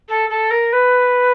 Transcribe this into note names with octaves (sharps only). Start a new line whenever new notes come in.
A4
A4
A#4
B4